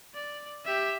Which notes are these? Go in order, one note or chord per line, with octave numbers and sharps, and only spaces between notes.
D5
G4 E5